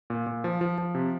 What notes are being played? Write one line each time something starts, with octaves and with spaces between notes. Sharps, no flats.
A#2
A#2
F3
F3
F3
C3